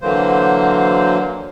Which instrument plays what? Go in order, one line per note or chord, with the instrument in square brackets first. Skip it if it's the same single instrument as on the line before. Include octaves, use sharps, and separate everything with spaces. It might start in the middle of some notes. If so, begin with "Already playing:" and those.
[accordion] D3 E3 F#3 A#3 C5